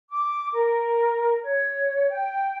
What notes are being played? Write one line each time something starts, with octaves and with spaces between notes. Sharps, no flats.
D6
A#4
C#5
G5